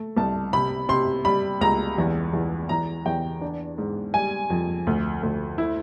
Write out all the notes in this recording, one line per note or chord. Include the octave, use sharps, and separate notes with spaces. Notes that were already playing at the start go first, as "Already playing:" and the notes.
Already playing: A3
C2 A5
C3 B5
C3 C6
G3 B5
C#2 A#5
E2
E2
E2 A#5
E2 G5
D4
G#2
G3 G#5
F2
D2
D2
E4